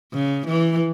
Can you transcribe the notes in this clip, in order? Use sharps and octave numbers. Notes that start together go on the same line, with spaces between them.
C#3
E3